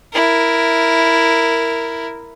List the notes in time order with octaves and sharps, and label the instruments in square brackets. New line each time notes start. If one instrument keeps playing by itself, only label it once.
[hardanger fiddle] E4 A#4